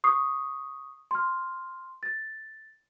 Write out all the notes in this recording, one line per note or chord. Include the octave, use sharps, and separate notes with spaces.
C#6 D#6 C7
C6 F6
A6